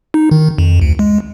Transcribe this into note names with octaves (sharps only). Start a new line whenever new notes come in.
D#4
D#3
F2
D2
G#3